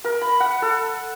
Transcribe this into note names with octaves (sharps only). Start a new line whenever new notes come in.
A#4
B5
F#5
A4